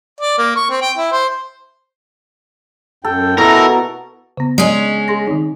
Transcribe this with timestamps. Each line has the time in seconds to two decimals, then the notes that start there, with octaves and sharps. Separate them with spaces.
0.20 D5
0.38 A#3
0.56 C#6
0.70 C4
0.82 G5
0.98 E4
1.12 C5
3.05 F#2 A4 G5
3.38 B2 E4 A4 A#4 A#5
4.37 C#3 B3
4.58 G#3 C#4 D5 D#5
5.08 G#4 C6 A#6
5.27 D#3 C4 D#4